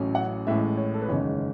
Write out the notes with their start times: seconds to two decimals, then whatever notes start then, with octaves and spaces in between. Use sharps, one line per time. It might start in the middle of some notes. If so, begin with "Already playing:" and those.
Already playing: A1 A2 F#3 C#4
0.15 F#5
0.47 A1 A2 G#3 E5
0.77 C#5
0.94 A4
1.02 B4
1.08 F#1 E2 D#3 G#3 C#4 C#5